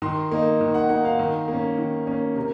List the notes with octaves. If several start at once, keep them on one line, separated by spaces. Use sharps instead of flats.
D#3 C6
A#3 D#4
D#3
F#5
A#3 D#4 F#5
F5
D#3
A#3 C#4
D#3
A#3 C#4
C3 A#4